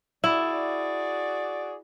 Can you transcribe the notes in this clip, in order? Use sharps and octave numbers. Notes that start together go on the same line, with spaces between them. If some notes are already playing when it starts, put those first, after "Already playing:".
E4 F#4 G#4 D5